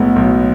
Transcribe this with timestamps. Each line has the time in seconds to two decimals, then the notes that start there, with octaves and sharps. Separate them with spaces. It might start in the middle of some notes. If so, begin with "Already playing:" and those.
Already playing: B1 A2 G#3 B3
0.16 B1